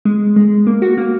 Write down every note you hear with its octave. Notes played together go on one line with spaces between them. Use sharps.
G#3
G#3
A#3
F#4
A#3